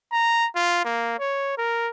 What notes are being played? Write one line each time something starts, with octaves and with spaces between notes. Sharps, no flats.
A#5
F4
A#3
C#5
A#4